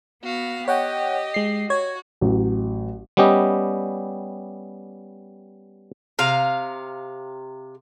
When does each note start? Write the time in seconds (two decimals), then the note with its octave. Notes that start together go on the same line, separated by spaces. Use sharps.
0.24 B3 F#4 F5
0.68 G4 C#5 D#5 F#5 G5
1.34 G#3 C7
1.70 F#4 C#5 G#6
2.21 A1 F#3
3.17 G3 B3 C#4 G4 D#5
6.19 C3 F5 A#5